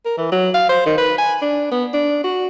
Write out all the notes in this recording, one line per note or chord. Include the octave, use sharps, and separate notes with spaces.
A#4
E3
F#3
F5
C5
D#3
B4
G#5
D4
B3
D4
F#4